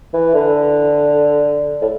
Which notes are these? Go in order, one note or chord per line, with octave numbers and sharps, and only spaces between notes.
E3
D3
A2